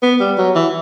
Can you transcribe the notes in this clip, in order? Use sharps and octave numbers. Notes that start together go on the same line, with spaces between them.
B3
G3
F#3
E3